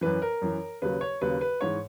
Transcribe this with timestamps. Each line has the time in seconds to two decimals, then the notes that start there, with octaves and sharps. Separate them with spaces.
0.01 F#2 E3 B4
0.22 A#4
0.42 F#2 E3
0.82 D#2 C#3 F#3 B4
1.01 C#5
1.21 D#2 C#3 F#3 B4
1.41 B4
1.61 G#2 E3 C#5